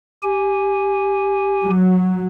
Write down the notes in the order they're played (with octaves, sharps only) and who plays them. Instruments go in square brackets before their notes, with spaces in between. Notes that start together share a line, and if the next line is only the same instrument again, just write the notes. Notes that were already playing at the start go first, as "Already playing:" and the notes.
[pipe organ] G4 G#5
[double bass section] F#3